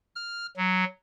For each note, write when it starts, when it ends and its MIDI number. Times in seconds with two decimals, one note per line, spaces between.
0.15 0.46 89
0.57 0.84 54